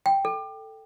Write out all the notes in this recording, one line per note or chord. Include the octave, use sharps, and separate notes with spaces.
G5
A4